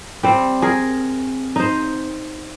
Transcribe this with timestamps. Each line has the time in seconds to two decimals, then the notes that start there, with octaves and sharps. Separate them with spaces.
0.23 G3 C4
0.62 G#4 A#4
1.56 D#4 C5